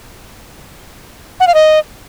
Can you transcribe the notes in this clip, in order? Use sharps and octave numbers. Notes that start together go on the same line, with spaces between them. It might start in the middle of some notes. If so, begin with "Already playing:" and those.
F#5
F5
D#5